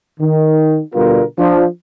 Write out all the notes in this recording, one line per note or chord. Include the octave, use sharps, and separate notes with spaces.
D#3
B2 D3 G3 B3 F4 A#4
F3 D4